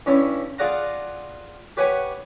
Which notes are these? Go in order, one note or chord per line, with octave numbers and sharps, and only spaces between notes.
G2 C#4 E4
F4 G#4 D5 F#5 A#5
G4 B4 C#5 F#5 G#5 C#6